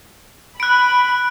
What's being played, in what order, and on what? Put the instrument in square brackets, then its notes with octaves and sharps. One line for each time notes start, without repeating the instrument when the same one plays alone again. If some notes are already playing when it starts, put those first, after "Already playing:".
[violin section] B5 [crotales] F#6 D7